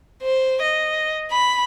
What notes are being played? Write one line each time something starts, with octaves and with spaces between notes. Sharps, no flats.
C5
D#5
B5